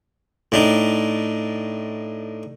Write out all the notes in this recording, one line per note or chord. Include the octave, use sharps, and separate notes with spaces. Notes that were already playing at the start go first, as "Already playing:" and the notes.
A2 D4 D#4